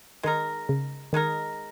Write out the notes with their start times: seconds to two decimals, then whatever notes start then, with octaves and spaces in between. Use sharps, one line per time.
0.23 D#3 G#3 D#4 A#4
0.69 C#3
1.13 D#3 G#3 D#4 A#4